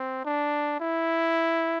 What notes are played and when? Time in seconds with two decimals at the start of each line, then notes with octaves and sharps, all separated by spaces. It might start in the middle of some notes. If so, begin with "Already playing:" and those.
Already playing: C4
0.25 D4
0.80 E4